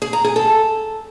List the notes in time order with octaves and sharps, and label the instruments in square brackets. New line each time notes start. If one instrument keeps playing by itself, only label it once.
[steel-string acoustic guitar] G#4
A#5
G#4
A4